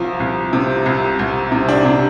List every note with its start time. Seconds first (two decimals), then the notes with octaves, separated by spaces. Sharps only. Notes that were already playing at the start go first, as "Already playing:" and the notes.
Already playing: C2 F3
0.20 C2
0.53 C3
0.86 C2
1.19 C2
1.52 C3
1.68 D4
1.85 C3